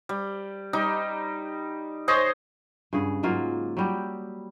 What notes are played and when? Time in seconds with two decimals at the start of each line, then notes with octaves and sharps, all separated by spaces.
0.09 G3
0.73 G3 D#4
2.08 G#4 C5 C#5 D#5
2.93 G2 C#3 G#4 F#5
3.23 G#2 F#3 A#3 F4
3.77 F#3 G3 G4